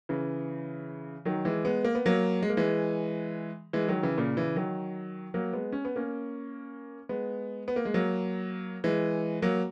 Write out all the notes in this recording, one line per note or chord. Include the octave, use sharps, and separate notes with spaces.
C#3 E3
D#3 F#3
E3 G#3
G#3 B3
A#3
B3
F#3 A#3
G#3
A#3
E3 G#3
E3 G#3
D#3 F#3
C#3 E3
A#2 C#3
C#3 E3
D#3 F#3
F#3 A#3
G#3 B3
C#4
B3
A#3 C#4
G#3 B3
B3
A#3
G#3
F#3 A#3
E3 G#3
F#3 A#3